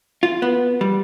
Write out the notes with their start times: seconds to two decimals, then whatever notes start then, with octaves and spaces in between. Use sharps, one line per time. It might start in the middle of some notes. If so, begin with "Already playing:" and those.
0.23 F4
0.42 B3
0.81 G3